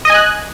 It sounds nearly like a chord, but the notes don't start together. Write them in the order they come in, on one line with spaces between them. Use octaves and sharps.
D#5 G#5 F#6